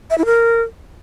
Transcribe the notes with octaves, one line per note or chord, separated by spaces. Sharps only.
E5
E4
A#4